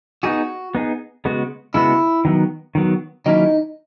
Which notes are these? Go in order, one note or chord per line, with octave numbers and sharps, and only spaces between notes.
B3 D#4 F#4 G#4
B3 D#4 G#4
C#3 G#3 B3 F#4
C#3 G#3 B3 E4 F#4
D#3 F#3 B3
D#3 F#3 B3
D#3 F#3 A#3 C#4 D#4 E4